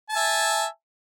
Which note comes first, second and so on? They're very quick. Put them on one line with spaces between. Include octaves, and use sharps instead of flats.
A5 G#5 E5